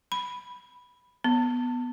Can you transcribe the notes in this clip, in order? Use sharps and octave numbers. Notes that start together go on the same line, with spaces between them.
B5
B3